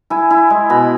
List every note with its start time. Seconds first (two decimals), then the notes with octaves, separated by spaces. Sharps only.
0.10 E4 G#5
0.31 E4
0.50 G#3
0.70 B2 B5